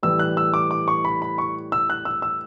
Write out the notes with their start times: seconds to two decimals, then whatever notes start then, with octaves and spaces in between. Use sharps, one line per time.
0.03 A2 E3 G3 E6
0.19 F#6
0.37 E6
0.54 D6
0.71 D6
0.88 C#6
1.05 B5
1.22 B5
1.38 C#6
1.72 E6
1.90 F#6
2.05 E6
2.22 E6